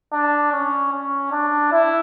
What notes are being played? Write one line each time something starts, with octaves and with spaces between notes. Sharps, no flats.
D4
C#4
C#4
D4
E4